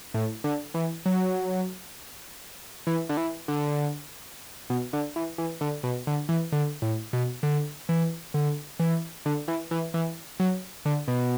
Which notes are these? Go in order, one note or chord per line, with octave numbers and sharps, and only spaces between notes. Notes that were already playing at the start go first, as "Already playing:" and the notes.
A2
D3
E3
F#3
E3
D3
E3
D3
B2
D3
E3
E3
D3
B2
D3
E3
D3
A2
B2
D3
E3
D3
E3
D3
E3
E3
E3
F#3
D3
B2